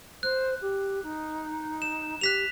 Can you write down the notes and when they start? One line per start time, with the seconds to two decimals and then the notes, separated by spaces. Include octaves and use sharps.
0.23 C5 F#6
0.61 G4
1.03 D#4
1.82 E7
2.21 G4 F#6 B6 F7